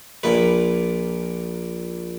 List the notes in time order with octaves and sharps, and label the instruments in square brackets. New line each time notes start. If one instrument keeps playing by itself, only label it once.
[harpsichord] A#1 A#2 B4